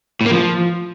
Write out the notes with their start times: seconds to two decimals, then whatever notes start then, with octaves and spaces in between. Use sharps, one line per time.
0.21 A2
0.26 A#3
0.31 F3